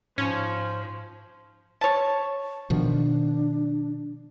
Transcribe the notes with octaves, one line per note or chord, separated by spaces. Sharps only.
G#2 F3 C#4
C#5 A5
B2 D#3 F3 D4